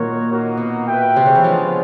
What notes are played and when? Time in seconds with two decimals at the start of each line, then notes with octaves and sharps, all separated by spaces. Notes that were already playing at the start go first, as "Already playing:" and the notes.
Already playing: A#2 D#3 F#4 A#4 C#5
0.28 A#3 D#4 F#4 A#4
0.57 B2
0.87 F#4 B4 E5 G5
1.16 C3
1.26 C#3
1.35 E3
1.44 F3 G#3 B3 D4